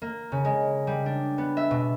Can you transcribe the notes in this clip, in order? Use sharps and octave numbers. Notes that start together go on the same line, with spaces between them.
A#3
C#3
G#3
G3
D4
B3
E5
B2